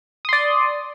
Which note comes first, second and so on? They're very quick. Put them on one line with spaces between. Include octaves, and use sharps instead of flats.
D#6 C6 D5